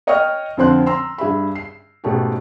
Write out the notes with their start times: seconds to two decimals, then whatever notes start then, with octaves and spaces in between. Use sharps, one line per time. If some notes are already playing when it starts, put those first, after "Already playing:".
0.07 C#5 D#5 G5 C#6 D#6 F6
0.57 F2 D3 F3 C4 C6 F#6
0.86 A#5 C6 E6
1.18 G2 G#4 E5 B5
1.55 C7
2.04 G#2 B2 A3 C#4 G4